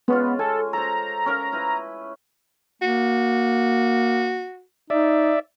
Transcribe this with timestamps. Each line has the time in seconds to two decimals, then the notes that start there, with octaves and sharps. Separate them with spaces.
0.08 G#3 B3 C#4 F4
0.39 A4 G#5
0.73 A4 C5 A#5
1.26 C#4 A#4 F5
1.53 E4 B4
2.82 A#3 F#4
4.90 D#4 D5 E5